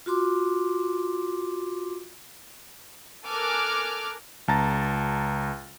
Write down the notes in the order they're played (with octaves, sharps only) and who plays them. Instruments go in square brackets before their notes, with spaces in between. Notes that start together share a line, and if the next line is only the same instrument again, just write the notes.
[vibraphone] F4 F#4 C6 D6
[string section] A4 A#4 G#5 D6 F6 F#6
[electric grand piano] C#2 A5 A#5 A6